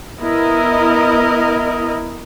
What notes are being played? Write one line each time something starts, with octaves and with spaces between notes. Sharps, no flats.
B3 E4 A#4 D#5